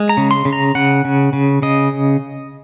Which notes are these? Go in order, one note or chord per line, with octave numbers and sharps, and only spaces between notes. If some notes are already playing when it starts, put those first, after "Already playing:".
Already playing: G#3
A#5
C#3
C6
C#3
A#5
C#3 F#5
C#3
C#3
C#3 D#5